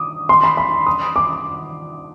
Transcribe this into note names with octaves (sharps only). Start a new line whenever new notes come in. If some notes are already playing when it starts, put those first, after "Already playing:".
Already playing: D6 D#6
C6
B5
B5
D#6
D6